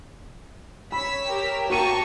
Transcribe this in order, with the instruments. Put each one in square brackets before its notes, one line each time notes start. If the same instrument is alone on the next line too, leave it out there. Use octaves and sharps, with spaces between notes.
[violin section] C#5 E6 B6 [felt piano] B5
[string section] G4 A#4
[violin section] A#3 C#6 [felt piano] F#4 D#7 [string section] G5 A5 A#5